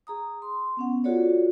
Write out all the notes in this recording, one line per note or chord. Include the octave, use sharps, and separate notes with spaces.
G#4 A#5 D#6
C6
B3 C#4 F#5
F4 F#4 G#4 A4 C#5 D5